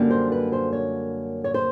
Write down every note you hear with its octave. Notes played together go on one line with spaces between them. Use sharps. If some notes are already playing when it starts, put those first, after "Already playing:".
Already playing: F#2 D3 G3 A#3
C5
B4
C5
C#5
C#5
C5